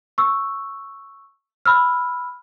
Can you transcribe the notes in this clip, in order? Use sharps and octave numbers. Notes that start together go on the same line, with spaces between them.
C#6 E6
B5 E6 F6